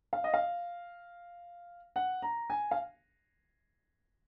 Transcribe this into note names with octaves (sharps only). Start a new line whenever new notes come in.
F5
D#5
F5
F#5
A#5
G#5
F5